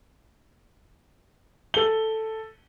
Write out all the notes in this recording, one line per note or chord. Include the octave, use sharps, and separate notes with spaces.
A4 G7